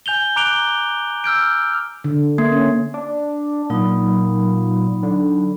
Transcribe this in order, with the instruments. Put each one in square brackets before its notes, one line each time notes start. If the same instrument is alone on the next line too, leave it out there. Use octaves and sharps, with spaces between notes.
[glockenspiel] G#5 G6 F7 G7
A#5 D6 F#6 D7 F7 G7
E6 F6 G6 D7
[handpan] D3
[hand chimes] A#3
[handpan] C#4
[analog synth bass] D4
[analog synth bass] A#2 [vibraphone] F#3 D#4 B5
[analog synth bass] D3